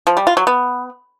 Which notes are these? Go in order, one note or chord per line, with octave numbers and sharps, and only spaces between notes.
F3
G3
F4
F#3
B3